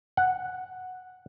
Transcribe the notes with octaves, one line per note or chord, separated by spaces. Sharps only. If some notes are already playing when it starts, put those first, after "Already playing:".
F#5